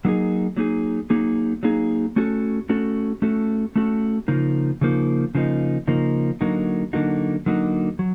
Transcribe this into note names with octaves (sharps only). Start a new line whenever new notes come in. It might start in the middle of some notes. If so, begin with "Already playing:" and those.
F#3 A#3 D#4 G#4
F#3 A#3 D#4 G#4
F#3 A#3 D#4 G#4
F#3 A#3 D#4 G#4
A3 C#4 F#4 A4
A3 C#4 F#4 A4
A3 C#4 F#4 A4
A3 C#4 F#4 A4
C#3 F3 A#3 D#4
C#3 F3 A#3 D#4
C#3 F3 A#3 D#4
C#3 F3 A#3 D#4
D3 F#3 A#3 D#4 F#4
D3 F#3 A#3 D#4 F#4
D3 F#3 A#3 D#4 F#4
F#3